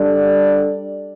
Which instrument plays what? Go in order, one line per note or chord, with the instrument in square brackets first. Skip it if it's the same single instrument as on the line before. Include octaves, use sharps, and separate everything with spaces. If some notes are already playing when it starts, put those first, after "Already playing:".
Already playing: [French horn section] G3 D4 A4 D5